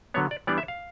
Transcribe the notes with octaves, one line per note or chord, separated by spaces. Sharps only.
D3 F#3 B3 C#5
D5
E3 G3 B3 D4 D5
E5
F5